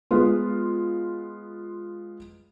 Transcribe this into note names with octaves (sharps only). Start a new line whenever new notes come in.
G#3 B3 F4